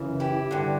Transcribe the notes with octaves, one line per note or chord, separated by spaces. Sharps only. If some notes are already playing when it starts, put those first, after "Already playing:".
Already playing: F#2 C#3 E3
E4 G4
G2 D3